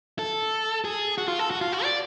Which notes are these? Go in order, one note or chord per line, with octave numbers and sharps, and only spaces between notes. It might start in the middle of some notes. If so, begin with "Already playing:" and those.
A4
G#4
F#4
F4
A4
F#4
F4
F#4
D5